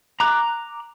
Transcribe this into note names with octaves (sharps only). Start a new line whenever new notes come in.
A#5 D6 F#6